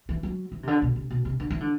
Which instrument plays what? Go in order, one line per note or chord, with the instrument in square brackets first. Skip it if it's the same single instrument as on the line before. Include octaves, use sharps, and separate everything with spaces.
[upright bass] E3
F#3
E3
C3
D3
B2
C3
B2
C3
D3
E3
D3